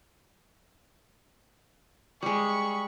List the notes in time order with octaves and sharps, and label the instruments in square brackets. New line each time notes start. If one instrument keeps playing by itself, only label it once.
[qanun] G3 G#3 [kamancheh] B5 C#6